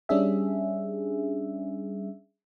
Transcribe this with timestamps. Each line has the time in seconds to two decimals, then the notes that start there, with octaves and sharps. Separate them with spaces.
0.09 G3 C#4 D4 G#4 E5